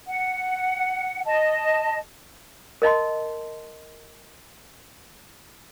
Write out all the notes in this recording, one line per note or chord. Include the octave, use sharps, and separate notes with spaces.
F#5
D#5 A5
A#4 D#5 A5 C6